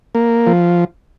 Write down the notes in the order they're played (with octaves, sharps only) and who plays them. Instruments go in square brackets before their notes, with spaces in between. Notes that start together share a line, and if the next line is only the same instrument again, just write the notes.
[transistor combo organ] A#3
F3